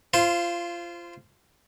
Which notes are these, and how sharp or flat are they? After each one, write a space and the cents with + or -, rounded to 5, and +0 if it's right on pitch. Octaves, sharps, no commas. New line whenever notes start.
F4 -20 C5 +0